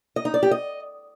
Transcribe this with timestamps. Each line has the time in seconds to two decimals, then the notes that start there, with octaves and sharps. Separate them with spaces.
0.16 D#5
0.25 D#4
0.34 D5
0.43 G4
0.51 D#5